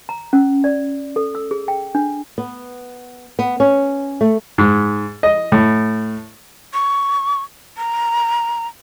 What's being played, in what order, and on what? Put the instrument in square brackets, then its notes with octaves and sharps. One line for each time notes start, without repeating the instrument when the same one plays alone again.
[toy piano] A#5
C#4
D5
A4
E6
G#4
G5
D4
[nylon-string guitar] B3
B3
C#4
A3
[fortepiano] G#2
D#5
A2
[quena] C#6
A#5